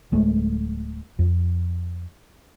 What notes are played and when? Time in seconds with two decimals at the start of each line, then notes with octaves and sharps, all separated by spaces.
0.12 D1 G#3 A3
1.19 F2